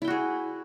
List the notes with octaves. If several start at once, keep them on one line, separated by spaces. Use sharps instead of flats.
E4 F#4 G#4 G5